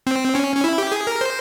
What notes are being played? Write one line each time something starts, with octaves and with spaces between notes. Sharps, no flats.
C4
C#4
C#4
E4
G4
G#4
A#4
C5